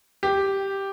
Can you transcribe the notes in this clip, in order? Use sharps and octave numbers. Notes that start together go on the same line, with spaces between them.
G4